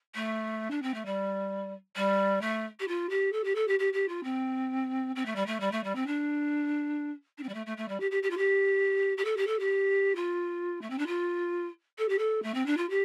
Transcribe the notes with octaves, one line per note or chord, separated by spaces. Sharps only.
A3
D4
C4
A3
G3
G3
A3
G4
F4
G4
A4
G4
A4
G4
G4
G4
F4
C4
C4
A3
G3
A3
G3
A3
G3
C4
D4
D4
C4
G3
A3
A3
A3
G3
G4
G4
G4
F4
G4
G4
A4
G4
A4
G4
F4
A3
C4
D4
F4
A4
G4
A4
A3
C4
D4
F4
G4